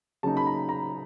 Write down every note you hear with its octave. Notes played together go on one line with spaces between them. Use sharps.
C#3 F#3 A#3 D#4 A5
B5
A#5
A#5